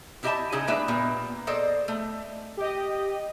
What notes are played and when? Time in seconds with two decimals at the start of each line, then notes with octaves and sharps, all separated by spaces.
0.23 B3 E4 G4 D#5 E5 A5
0.52 C#3 D#4 E4 G#4 D#5
0.67 G#3 A#3 D4 E4 B4 E5
0.88 A#2 A#3 B3 G4
1.47 G#4 A4 C5 D5 D#5
1.88 A3
2.57 G4 D#5